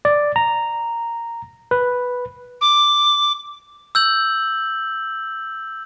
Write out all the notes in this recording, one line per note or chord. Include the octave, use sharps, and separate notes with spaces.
D5
A#5
B4
D6
E6 G6 F#7